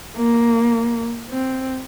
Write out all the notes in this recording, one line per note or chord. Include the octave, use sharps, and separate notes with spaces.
A#3
C4